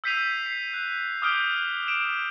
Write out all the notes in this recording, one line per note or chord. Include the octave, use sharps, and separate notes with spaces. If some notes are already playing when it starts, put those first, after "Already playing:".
E6 G6 B6 C7 D#7 F7
C7
F#6
D6 D#6 F6 G6 D7 G7
D7 E7